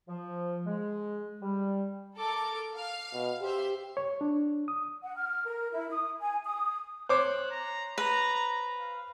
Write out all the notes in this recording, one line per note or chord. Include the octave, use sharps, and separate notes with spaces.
F3
G#3
G3
A4 A#4 D6
F5
B2
G4 C5 E5 C6
C#5
D4
D#6
F#5
F6
A#4
E4
D#6
G#5
D#6
C5 C#5 D6 F#6
A#5
B4 A#5
F5